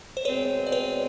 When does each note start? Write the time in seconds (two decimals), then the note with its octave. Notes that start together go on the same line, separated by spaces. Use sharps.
0.17 C5
0.25 B2 G#3 C4 B4 C#5
0.67 D5
0.72 B4 C#5